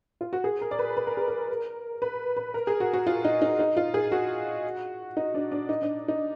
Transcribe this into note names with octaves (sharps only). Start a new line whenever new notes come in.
F4
F#4
G#4
A#4
D5
B4
B4
A#4
G#4
A#4
B4
B4
A#4
G#4
F#4
F#4
F4
D#4
D#4
D#4
F4
G#4
F#4
D#4
D4
D4
D#4
D4
D#4